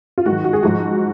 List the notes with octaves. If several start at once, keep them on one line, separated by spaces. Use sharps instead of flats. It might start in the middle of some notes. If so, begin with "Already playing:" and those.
F4
G#2 D#3 F#3 F#4
F#4
G#4
G#2 F3 F#4